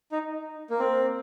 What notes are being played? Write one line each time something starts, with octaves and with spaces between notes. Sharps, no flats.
D#4
A#3
C4